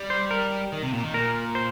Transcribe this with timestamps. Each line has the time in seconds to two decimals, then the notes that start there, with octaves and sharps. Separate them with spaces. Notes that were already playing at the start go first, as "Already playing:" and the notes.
Already playing: G3
0.10 C5
0.31 A#4
0.72 D#3
0.83 C3
0.93 A#2
1.04 D#3
1.14 A#2 A#4
1.55 C5